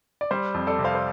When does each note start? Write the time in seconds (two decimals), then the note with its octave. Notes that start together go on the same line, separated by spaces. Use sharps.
0.21 D5
0.31 G3 C5
0.54 F2
0.67 A4 D5
0.79 C3
0.84 C5 F5
0.95 C5